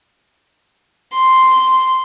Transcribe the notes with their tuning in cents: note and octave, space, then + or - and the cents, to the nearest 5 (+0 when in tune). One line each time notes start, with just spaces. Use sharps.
C6 -5